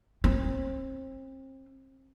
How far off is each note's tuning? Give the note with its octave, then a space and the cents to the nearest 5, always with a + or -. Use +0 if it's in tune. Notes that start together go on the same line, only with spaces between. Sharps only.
C4 +30